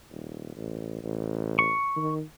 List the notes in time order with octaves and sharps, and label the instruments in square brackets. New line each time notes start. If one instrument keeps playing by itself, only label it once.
[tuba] D#1
A1
A1
[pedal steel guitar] C#6
[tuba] D#3